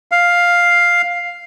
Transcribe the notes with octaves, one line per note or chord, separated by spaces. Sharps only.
F5